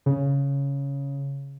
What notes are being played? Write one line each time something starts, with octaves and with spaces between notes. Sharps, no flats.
C#3